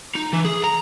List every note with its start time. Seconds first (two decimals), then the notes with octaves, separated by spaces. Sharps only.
0.16 D#4
0.33 E3
0.45 G#4
0.64 A#5